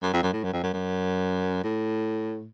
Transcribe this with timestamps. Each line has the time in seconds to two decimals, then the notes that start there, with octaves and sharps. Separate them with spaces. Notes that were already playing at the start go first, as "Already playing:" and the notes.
0.03 F#2
0.13 F2
0.23 F#2
0.33 A2
0.44 F#2
0.53 F2
0.63 F#2
0.73 F#2
1.64 A2